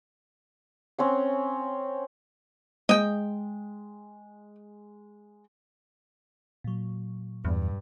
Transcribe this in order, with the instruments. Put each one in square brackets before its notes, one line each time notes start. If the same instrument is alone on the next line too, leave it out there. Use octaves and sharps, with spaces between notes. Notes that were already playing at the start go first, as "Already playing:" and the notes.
[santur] C4 C#4 F#5
[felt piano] G#3 [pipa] D#5 G5
[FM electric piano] A#2 F#3
[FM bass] E2 [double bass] G2